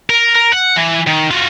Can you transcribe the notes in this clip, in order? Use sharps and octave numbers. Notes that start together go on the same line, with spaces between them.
A#4
A#4
F#5
E3
D#3
F4 F#4